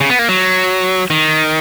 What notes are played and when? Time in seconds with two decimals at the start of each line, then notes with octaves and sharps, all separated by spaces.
0.01 C#3
0.10 B3
0.19 A#3
0.28 F#3
1.10 D#3